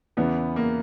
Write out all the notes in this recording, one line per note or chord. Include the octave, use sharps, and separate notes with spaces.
E2 C#3 E3 B3
A#3